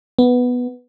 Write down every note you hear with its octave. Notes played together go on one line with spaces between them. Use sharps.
B3